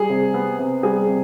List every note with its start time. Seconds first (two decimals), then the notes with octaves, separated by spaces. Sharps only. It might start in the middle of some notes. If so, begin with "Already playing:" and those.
Already playing: G3 G#4
0.09 C3
0.34 B3
0.59 C3
0.83 G3 G#4
1.08 C3